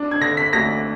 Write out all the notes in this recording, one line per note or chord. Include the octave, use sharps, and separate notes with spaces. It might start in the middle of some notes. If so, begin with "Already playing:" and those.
Already playing: D4
G#6
D3 A#6
B6
D2 A#6